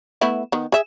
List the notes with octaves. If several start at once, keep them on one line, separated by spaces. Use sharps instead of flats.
A3 B3 E4
D#3 B3
G#4 E5